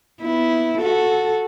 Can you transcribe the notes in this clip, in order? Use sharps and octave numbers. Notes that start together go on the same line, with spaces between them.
B3 E4
F#4 A4